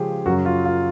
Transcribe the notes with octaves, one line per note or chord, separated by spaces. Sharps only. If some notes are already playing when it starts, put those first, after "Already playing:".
Already playing: C#3 F3 G#3 C#4 G4 G#4
F#2 C#3 F#3 F#4
F4
F4